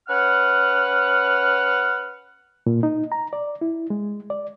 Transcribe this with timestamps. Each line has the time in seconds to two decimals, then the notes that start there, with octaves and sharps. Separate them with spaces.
0.08 C#4 B4 F#5 F6
2.66 A#2
2.83 D#4
3.12 A#5
3.33 D5
3.61 E4
3.90 G#3
4.30 D5